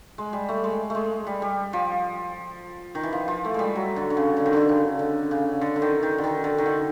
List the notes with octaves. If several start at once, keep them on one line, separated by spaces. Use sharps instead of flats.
G#3
G3
A3
G#3
G#3 A3
G3
G3
F3
D#3
E3
F3
F3
A3
G3 G#3
F#3
D3
D3
C#3
D3
D#3
D3
C#3
D3
C#3
D3
D3
D#3
D#3
D3
D#3
D3
D#3
D3